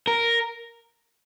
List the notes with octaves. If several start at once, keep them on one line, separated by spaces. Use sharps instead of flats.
A#4